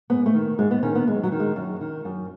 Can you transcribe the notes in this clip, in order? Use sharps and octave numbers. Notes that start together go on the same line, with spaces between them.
G#2 B3
A3
D#3
G#2 G#3
B3
D#3 C#4
B3
F#2 G#3
F#3
D#3
G#3
F#2
D#3
F#2